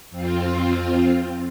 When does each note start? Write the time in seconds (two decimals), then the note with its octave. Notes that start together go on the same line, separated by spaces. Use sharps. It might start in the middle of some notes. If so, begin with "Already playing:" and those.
0.10 F2 C4 F4